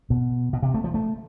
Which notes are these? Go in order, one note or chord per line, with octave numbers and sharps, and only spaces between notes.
B2
B2
C3
A3
F3
A3